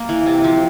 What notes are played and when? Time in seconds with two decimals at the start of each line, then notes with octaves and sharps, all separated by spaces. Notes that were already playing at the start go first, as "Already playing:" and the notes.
Already playing: A#3
0.09 E3
0.26 C3
0.44 F3